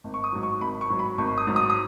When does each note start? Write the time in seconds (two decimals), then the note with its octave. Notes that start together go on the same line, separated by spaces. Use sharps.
0.04 G#1
0.14 C#6
0.24 D#6
0.32 G#2 F#3
0.43 C#6
0.61 G#1 B5
0.81 C#6
0.90 G#2 F#3
0.99 B5
1.18 G#1 C#6
1.38 D#6
1.47 G#2 F#3
1.56 D#6
1.70 D#6